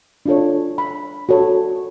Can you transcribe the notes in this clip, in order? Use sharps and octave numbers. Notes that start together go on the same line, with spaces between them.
D4 F4 A4 C#5
B5
F#4 A4 C#5